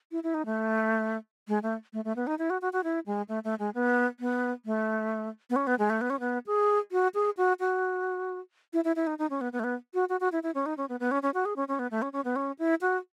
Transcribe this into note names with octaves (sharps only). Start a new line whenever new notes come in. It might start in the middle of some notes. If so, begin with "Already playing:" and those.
E4
E4
D#4
A3
G#3
A3
A3
A3
B3
D#4
E4
F#4
F#4
F#4
E4
G#3
A3
A3
G#3
B3
B3
A3
B3
C#4
B3
G#3
A3
B3
C#4
B3
G#4
F#4
G#4
F#4
F#4
E4
E4
E4
D#4
D#4
C#4
B3
B3
A3
B3
F#4
F#4
F#4
E4
E4
C#4
D#4
C#4
B3
B3
C#4
C#4
F#4
G#4
C#4
C#4
B3
A3
C#4
C#4
B3
C#4
E4
F#4